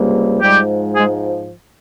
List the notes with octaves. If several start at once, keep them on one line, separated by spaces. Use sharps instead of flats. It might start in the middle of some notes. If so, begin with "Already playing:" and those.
Already playing: C#2 C3 G3 A#3
G#2 F3 G3 G#3 G4
G#3 G#4